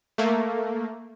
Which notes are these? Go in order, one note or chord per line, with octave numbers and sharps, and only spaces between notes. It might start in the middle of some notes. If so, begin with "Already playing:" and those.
A3 A#3